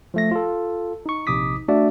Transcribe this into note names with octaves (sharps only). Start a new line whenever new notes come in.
F3 A3 A#6
F4 A4
D#4 C#6
A#1 C3 D#4 D6 D#6 B6
A3 D4 F#4 D5 E5